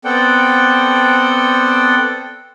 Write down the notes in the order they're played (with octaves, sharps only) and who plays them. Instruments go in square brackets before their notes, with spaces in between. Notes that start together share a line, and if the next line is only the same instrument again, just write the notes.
[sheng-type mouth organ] B3 C4 A4 D5 F#5 G5